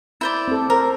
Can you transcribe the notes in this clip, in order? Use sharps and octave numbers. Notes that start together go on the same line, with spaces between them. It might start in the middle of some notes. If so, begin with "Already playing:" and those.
E4 C5 D5
C4 A4
A#4 C5